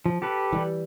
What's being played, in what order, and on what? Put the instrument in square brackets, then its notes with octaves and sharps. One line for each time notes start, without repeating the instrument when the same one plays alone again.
[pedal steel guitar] F3
G4 A4 B4
[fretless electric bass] E3 G3